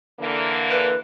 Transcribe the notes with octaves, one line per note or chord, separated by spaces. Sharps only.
D3 E3 A#3
B4